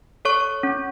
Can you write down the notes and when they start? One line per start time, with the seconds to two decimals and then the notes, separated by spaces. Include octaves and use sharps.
0.25 A4 C#5 C#6
0.63 C#4